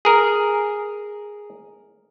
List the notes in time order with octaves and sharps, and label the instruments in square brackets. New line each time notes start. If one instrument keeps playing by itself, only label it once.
[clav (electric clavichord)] G#4 A#4